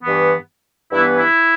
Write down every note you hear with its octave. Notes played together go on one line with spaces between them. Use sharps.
G2 E3 B3
G2 E3 B3 E4
E4